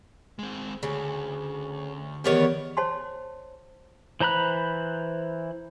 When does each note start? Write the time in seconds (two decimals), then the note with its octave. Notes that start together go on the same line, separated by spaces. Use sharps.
0.39 G#3 C4
0.83 D2 C#3
2.24 E2 D#3 G3 B3 C#5
2.77 C5 C#5 A5 C6
4.21 E3 C5 A#5 B5 F#6